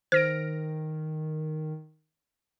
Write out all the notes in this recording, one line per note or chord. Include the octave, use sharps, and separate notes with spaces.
D#3 C5 F6 A#6 D7